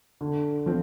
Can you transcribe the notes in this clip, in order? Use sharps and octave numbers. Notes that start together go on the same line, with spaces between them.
D3
F3 C4